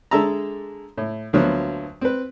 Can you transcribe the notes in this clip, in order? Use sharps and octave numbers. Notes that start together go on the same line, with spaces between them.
D3 G#3 A4 E5 A5 A#5
A2
D2 F3 F#3 A#3 B3
C4 B4